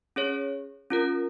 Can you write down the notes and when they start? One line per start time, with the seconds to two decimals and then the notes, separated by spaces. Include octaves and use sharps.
0.16 C#4 G#4 C#5
0.90 C#4 F4 A#4